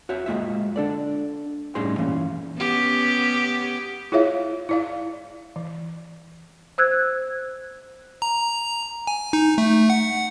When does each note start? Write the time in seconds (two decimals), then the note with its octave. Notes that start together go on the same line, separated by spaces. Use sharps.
0.09 F#4 C#5 E5
0.26 G#3 A#3 F4 E5
0.76 D4 A4 D5
1.75 A2 G3 C#4 D#4 G#4 C6
1.98 E3 A#3 C#4
2.58 B3 C#4 G4
4.12 E4 F4 G#4 C#5 E5 F5
4.69 E4 D5 F5
5.56 E3
6.78 C5 E6 F#6 G#6
8.22 A#5
9.07 G#5
9.33 D#4
9.58 A3
9.90 F#5